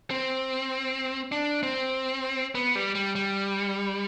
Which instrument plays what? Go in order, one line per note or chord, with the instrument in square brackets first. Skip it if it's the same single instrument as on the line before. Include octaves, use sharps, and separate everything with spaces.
[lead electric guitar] C4
D4
C4
B3
G3
G3
G3